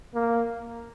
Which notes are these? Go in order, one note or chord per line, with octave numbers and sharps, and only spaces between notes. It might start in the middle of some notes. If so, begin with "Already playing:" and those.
A#3